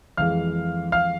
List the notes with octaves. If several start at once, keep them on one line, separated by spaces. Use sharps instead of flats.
F2 E3 G#3 F5 F6
F5 F6